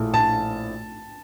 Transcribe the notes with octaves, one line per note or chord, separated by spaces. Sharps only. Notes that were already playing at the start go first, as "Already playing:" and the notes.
Already playing: A#1 A2 A3
A5